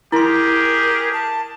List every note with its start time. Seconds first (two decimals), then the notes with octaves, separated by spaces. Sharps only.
0.12 E4 G4 G#4 A#4 C6
1.13 A5